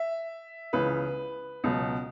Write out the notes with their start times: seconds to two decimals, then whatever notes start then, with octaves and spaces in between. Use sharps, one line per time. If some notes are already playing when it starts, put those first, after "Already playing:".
Already playing: E5
0.73 C#2 C#3 E3 B4
1.64 C#2 B2 F#3